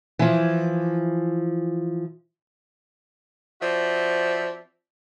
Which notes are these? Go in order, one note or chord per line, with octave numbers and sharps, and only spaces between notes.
E3 F3
F3 C4 F#4 D5 E5